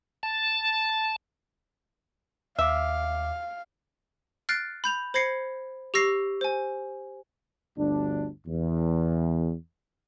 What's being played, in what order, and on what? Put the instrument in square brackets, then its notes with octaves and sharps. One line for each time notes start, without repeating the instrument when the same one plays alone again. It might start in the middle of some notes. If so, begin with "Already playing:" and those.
[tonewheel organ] A5
[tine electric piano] D#2 D6 [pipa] E5 [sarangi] F5
[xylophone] F6 F#6 A6 C7 D7
B5 G6 F7
C5 B5 G#6 A#6 C7 C#7
G4 C#6 E6 A#6 C7
C5 G#5
[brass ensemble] G1 D2 D4
E2